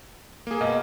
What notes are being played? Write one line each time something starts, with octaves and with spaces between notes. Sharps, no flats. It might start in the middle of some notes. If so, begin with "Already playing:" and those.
A#3 G#4
B2 A#3 D#5